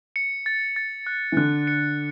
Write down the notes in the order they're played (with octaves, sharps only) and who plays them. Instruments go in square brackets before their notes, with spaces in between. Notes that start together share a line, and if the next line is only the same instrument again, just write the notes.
[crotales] C#7
A6
A6
F#6
[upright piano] E3
[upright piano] D3 [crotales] F#6
[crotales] C#7